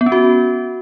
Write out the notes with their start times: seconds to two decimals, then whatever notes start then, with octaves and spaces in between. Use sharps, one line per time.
0.01 B3
0.06 C#4
0.12 F#4